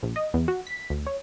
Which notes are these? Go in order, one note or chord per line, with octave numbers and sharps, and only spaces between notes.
A#1
D#5
E2
F#4
B6
D2
C#5